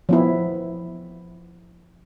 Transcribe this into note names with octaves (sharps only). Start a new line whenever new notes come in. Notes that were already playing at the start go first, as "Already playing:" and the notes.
F3 B3 E4